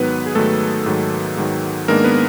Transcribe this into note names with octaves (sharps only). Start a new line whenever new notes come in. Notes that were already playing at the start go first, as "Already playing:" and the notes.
Already playing: G#2 D#3 F#3 B3 B4
G#4
G#2 D#3 F#3 A3 A4
G#2 D#3 F#3
G#2 D#3 F#3
G#2 D#3 G#3 A#3 B3 D4 A#4
B3 B4